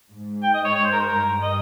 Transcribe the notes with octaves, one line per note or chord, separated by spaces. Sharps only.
G#2
G5
D#5
C#5
C#5
C5
A#4
C5
G2 A#4
D#5